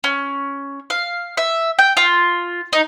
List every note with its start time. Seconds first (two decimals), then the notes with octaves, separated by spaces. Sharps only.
0.04 C#4
0.90 F5
1.37 E5
1.79 G5
1.97 F4
2.73 D#4